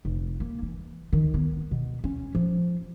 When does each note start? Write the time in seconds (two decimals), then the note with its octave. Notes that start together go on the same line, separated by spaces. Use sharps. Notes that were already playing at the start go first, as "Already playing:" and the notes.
0.05 F1
0.40 A#3
0.62 E3
1.13 D#3
1.34 B3
1.71 B2
2.04 C#4
2.35 F3